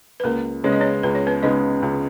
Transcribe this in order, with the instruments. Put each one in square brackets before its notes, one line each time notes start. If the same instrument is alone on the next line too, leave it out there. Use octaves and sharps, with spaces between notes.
[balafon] B4
[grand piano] C#2 [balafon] A#3 A#4
[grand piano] C#3 G#3 B3 [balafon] C#5
[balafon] D#5
C#4 C#5
[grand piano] C#2 [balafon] B4
[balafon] C#5
B3 B4
[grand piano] C#3 G#3 B3 [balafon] D#4 D#5
[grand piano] C#2